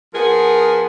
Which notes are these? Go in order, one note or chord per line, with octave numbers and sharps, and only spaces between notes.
F3 B3 G#4 A#4